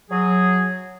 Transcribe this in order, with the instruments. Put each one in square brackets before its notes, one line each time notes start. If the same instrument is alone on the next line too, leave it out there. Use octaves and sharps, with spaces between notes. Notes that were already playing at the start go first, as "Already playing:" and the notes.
[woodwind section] F#3 G#4